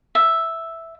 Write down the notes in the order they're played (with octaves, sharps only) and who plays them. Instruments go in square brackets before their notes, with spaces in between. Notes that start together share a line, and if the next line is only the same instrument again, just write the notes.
[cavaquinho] E5